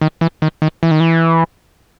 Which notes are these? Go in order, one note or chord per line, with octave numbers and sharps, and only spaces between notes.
D#3
E3
D#3
D#3
E3
D#3
E3